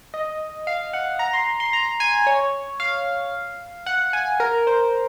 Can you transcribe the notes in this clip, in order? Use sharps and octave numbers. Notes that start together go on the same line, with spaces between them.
D#5
F5
F#5
A#5
C6
C6
A#5
G#5
C#5
F5
F#5
G#5
A#4
C5